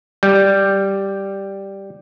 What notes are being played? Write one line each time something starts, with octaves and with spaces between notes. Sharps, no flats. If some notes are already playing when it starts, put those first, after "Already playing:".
G3